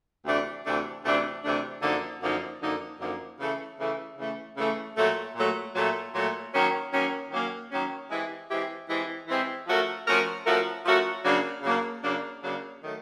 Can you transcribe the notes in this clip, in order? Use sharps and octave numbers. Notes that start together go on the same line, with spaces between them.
D2 C3 E3 A3 D4
D2 C3 E3 A3 D4
D2 C3 E3 A3 D4
D2 C3 E3 A3 D4
F#2 D3 F3 A#3 D#4
F#2 D3 F3 A#3 D#4
F#2 D3 F3 A#3 D#4
F#2 D3 F3 A#3 D#4
C#3 E3 A3
C#3 E3 A3
C#3 E3 A3
C#3 E3 A3
A#2 F#3 A3
A#2 F#3 A3
A#2 F#3 A3
A#2 F#3 A3
D#3 F#3 A#3 C#4
D#3 F#3 A#3 C#4
D#3 F#3 A#3 C#4
D#3 F#3 A#3 C#4
E3 G#3 C4 E4 G4
E3 G#3 C4 E4 G4
E3 G#3 C4 E4 G4
E3 G#3 C4 E4 G4
F3 A3 C#4 F#4 A#4
F3 A3 C#4 F#4 A#4
F3 A3 C#4 F#4 A#4
F3 A3 C#4 F#4 A#4
C#3 F#3 A#3 D4
C#3 F#3 A#3 D4
C#3 F#3 A#3 D4
C#3 F#3 A#3 D4
D#3 F#3 A3